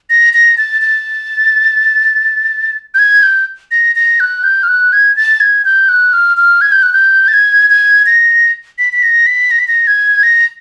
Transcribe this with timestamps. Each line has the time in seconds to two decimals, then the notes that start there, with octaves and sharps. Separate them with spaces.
0.10 A#6
0.34 A#6
0.58 A6
0.82 A6
2.94 G6
2.99 G#6
3.23 G6
3.71 A#6
3.96 A#6
4.20 F#6
4.44 G6
4.63 F6
4.68 F#6
4.93 G#6
5.16 A6
5.40 G#6
5.65 G6
5.89 F#6
6.13 F6
6.37 F6
6.61 G#6
6.72 G6
6.83 F#6
6.93 G6
7.28 A6
7.34 G#6
7.70 G#6
8.06 A#6
8.79 B6
8.93 B6
9.03 A#6
9.27 B6
9.51 A#6
9.59 B6
9.68 A#6
9.87 G#6
10.23 A#6